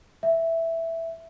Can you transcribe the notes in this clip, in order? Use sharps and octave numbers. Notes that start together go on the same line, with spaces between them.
E5